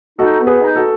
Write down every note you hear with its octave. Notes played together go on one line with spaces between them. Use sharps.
D#4 F#4 A4
B3
G#4 B4
D#4
F#4 A4